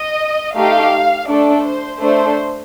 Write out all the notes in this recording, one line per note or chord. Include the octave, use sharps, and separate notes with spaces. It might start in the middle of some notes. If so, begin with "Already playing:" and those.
Already playing: D#5
A3 D#4 G4 F5
A3 D4 A4 D5
C5
A3 D4 A4 C5